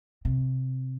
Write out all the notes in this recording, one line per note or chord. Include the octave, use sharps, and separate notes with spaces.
C3